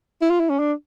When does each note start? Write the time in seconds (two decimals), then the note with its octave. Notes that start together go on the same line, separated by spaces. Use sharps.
0.22 E4
0.31 F4
0.40 E4
0.50 C#4
0.59 D4